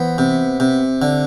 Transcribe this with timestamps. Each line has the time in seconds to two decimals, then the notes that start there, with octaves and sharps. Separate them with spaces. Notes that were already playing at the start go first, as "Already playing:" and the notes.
Already playing: E3 B3 C5
0.18 C3
0.60 C3
1.02 D3